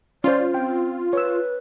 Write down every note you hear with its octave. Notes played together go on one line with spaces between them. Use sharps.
C#4 F4 C5 D5
C4 G5
B4 C#5 E6